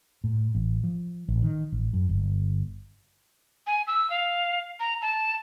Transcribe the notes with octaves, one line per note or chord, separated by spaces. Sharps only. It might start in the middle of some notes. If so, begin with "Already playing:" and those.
A2
A1
F3
A1
D#3
A1
F#2
G1
G#5
E6
F5
A#5
A5